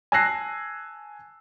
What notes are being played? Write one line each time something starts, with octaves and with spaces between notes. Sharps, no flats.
G#5 A5 E6 F#6 A#6 C7